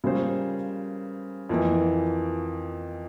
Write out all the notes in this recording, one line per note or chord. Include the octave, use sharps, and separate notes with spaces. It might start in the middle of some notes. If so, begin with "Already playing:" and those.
C#3 G3 A#3 F4 C5
F2 E3 A#3